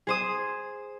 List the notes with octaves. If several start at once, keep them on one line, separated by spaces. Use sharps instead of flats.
G#4 C5 D#6